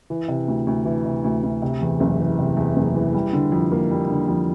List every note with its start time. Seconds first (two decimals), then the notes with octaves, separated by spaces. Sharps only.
0.10 E3
0.28 C3
0.48 D2
0.67 D2
0.85 E3
1.05 C3
1.24 D2
1.43 D2
1.62 C3
1.81 E2
2.00 F#1
2.19 E3
2.39 C3
2.57 E2
2.76 F#1
2.95 E3
3.14 G3
3.33 D3
3.52 F2
3.72 A#3
3.91 G3
4.10 D3
4.28 F2